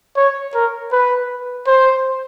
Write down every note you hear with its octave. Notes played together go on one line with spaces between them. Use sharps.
C#5
A#4
B4
C5